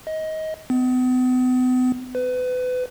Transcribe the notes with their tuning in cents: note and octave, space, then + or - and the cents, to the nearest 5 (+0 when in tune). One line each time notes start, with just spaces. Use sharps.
D#5 +20
B3 +40
B4 +30